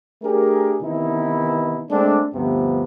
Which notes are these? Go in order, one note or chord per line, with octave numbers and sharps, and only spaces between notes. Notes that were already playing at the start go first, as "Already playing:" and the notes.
A3 D4 G4 G#4 A#4
C3 D#3 E3 B3 D#4 E4
G#3 A3 C4 D4
D2 G2 C3 F3 B3